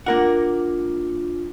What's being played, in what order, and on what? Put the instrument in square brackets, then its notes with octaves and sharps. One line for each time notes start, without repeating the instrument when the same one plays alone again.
[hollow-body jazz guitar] A#3 A#4 F#5 [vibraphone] D4 F4